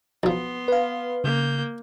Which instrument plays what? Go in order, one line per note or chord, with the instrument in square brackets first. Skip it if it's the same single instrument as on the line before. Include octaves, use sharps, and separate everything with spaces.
[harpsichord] B1 F3 [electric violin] B3 C6
[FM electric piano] B4 F5
[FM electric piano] C#3 [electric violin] A#3 G6